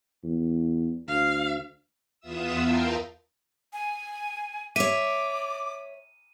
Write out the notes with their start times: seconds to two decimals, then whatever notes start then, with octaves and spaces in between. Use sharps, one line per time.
0.24 E2
1.08 D2 F5
2.20 E2 B3 F4 E5 D#6 E6
2.62 A#4 F5 G5 A5 C6
3.73 G#5
4.76 C#5 E5 D6 D#7